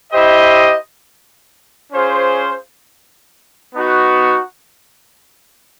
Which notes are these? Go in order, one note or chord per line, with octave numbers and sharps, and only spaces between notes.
E4 G4 C5 D#5
C#4 F4 G#4 C5
B3 D#4 F#4